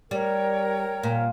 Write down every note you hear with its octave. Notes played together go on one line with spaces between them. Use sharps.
G3 A#4 C#5 G5
A#2